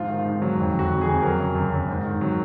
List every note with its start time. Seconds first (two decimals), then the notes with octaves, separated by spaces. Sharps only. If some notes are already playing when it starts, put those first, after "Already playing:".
Already playing: G#2 F3 F4
0.08 D#3
0.14 F4
0.25 G#2
0.42 F#3
0.57 F2
0.74 F2
0.79 F#4
0.90 F2
1.01 G#4
1.06 F2
1.22 F#3 A#4
1.39 C#3
1.55 F#2
1.72 F#2
1.88 G#2
2.05 D#3
2.21 F#3